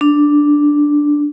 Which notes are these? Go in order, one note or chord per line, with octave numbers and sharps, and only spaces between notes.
D4